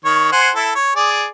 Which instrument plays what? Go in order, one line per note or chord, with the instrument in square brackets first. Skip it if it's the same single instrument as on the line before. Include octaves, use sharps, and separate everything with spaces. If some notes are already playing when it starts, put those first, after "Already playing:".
[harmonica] D#3 C#5
C5 F#5 G#5
E4 A4
C#5
G#4 D5